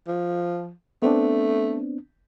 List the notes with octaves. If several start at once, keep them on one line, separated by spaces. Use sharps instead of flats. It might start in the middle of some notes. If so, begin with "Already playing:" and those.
F3
A3 B3 C4 D4